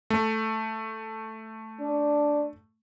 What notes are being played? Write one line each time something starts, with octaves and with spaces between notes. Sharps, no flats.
A3
D4